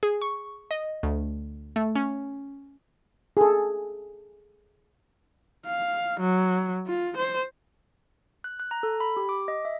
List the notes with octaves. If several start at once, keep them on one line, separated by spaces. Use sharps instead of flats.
G#4
C#6
D#5
D2
A3
C#4
G#4 A4
F5
F#3
F4
C5
F#6
F#6
A#5
A4
B5
G4
D6
D#5
E5